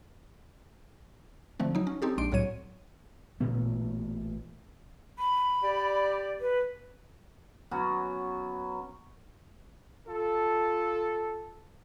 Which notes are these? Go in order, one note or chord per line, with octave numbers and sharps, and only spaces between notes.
D3 F3 A3 C4
F#3 D#4
C#4
C4 D#4 G4 A4
A#1 G#3 D4 C6 D7
C2 A2 F#3 C#5 D#7
A1 A#2 A3 B3
B5
G4 D5
B4
F#3 B3 C#4 F#4
F4 A4